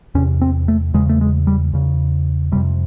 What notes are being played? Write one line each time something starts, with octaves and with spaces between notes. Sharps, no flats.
E2 C3 C#4
C4
A3
E2 C#3 G#3
A3
G#3
G3
E2 C#3
F2 C3 G3